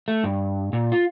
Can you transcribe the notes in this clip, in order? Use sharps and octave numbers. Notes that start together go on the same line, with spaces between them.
A3
G2
A#2
F4